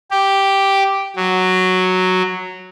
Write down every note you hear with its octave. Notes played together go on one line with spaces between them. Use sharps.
G4
F#3